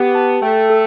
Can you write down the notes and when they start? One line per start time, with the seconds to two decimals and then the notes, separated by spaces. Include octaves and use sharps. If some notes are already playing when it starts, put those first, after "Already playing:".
Already playing: B3 G4
0.15 A5
0.42 A3 G5
0.70 A4